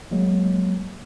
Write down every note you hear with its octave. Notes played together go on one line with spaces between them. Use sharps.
F#3 G#3 A#3